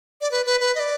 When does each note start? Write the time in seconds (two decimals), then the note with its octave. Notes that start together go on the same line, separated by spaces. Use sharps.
0.21 D5
0.31 B4
0.46 B4
0.60 B4
0.75 D#5
0.80 D5